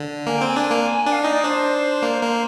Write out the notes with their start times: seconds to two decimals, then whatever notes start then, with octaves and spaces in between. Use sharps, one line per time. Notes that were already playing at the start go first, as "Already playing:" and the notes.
Already playing: D3
0.27 A#3 G#5
0.38 C4 G5
0.48 G#5
0.56 D4
0.71 A#3
1.06 D4
1.12 F5
1.23 D#4 D#5
1.33 D5
1.44 D4 C5
2.02 A#3
2.22 A#3